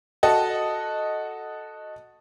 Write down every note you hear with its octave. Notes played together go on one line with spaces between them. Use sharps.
F#4 A4 D#5